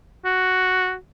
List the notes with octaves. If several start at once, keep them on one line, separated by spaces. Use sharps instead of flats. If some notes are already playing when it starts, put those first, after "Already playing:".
F#4